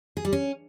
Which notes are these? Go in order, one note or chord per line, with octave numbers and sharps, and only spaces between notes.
G#4
G3
C#4